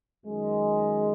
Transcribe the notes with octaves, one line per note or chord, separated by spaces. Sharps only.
F#2 D#3 G#3